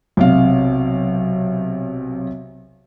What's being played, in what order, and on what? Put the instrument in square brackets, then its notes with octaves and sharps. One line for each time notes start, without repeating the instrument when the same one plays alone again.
[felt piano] B1 C3 F5